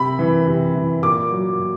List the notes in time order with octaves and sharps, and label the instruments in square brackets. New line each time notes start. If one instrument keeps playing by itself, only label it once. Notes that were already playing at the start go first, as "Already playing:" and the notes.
Already playing: [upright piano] C3 B5
E3
C3
E3
A#2 D6
F#3
A#2